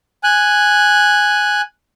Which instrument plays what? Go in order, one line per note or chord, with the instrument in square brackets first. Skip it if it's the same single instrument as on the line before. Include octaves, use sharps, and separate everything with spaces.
[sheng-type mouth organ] G#5 F#6